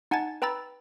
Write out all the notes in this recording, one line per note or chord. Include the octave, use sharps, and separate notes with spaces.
D#4 F#5 G#5 A5 G#6 A6
B4 G5 A#5 B5 E6 A6